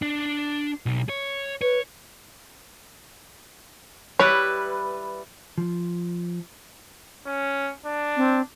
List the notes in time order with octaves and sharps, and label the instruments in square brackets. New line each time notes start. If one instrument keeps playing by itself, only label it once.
[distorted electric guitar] D4
B1
C#5
[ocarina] B4 [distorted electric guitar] C#5
[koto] G3 E4 B4 [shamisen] C#5
[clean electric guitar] F3
[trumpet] C#4
D4
[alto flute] C4